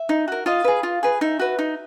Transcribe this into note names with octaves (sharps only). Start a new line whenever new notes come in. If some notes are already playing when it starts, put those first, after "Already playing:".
Already playing: E5
D#4
F#4 A#4
F4 D#5 F5
G#4 B4
F4
G#4 B4
D#4 E5
F#4 B4
D#4